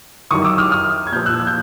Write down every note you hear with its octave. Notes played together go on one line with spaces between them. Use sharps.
F#2 D#3 C#6 D#6
D6 E6
D#6 F6
D#6 F6
G#6
A#2 F3 F6 G6
E6 F#6
F#6
G6